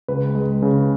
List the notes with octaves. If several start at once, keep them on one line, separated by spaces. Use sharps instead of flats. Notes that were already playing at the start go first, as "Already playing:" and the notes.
C#2 B4
G#3
C#3